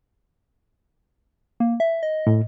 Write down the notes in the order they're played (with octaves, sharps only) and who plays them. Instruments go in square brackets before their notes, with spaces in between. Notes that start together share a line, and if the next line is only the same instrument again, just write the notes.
[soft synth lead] A#3
E5
D#5
[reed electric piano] A2